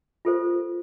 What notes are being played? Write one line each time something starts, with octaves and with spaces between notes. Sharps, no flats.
F4 G4 A4 A#4 C5